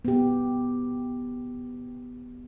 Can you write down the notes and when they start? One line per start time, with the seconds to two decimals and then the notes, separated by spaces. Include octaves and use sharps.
0.05 B3 G4